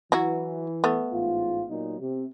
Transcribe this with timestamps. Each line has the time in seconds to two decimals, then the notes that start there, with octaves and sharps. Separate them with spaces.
0.12 E3 F#3 E4 F#4
0.84 A3 B3
1.13 A1 G#2 F4
1.70 A#2 F#3 D#4
2.01 C3